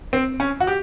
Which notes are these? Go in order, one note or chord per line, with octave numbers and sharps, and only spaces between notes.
C4
C#4
F#4
G4